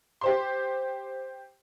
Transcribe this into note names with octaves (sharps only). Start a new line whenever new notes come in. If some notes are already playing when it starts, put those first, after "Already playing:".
G4 C5 C6